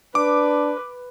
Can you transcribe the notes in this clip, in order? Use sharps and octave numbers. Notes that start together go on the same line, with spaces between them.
D4 B4 D6